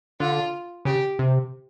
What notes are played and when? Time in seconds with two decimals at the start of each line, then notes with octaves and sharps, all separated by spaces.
0.20 D3 F4
0.85 C#3 G4
1.19 C3